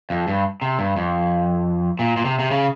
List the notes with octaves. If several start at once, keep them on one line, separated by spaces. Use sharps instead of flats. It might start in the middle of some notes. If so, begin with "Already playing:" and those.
F2
G2
C3
G2
F2
A#2
A#2
C3
C3
C#3